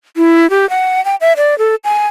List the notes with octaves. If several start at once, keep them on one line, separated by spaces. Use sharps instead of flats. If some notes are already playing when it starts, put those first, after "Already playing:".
E4
G4
F#5
G5
E5
D5
A4
G#5